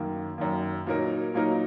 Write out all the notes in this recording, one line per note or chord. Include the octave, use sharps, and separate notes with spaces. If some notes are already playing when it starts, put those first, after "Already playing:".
Already playing: F#2 D#3 A#3
F#2 D#3 A#3
A#2 F#3 A#3 D#4 A#4
A#2 F#3 A#3 D#4 A#4